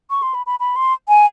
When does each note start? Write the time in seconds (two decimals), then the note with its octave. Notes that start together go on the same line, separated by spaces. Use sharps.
0.10 C#6
0.22 C6
0.34 B5
0.46 B5
0.60 B5
0.76 C6
1.08 G#5